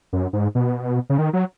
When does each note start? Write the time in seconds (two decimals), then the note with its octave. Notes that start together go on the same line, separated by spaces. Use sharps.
0.13 F#2
0.33 G#2
0.55 B2
1.10 C#3
1.18 D#3
1.33 F#3